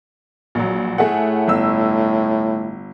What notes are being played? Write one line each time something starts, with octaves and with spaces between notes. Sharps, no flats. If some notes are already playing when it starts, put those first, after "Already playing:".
A#1 F#3
A2 A3 G#4 F#5
G1 E6